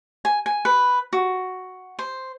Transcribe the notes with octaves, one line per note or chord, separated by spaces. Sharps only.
G#5
G#5
B4
F#4
C5